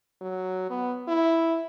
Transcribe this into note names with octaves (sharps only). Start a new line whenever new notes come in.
F#3
B3
E4